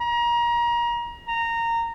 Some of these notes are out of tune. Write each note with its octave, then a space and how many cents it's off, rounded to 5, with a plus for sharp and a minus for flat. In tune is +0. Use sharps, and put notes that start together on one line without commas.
A#5 +30
A#5 -15